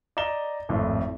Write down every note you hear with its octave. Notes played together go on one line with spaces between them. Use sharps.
D5 D#5 A#5 E7 G7
G#1 F2 A2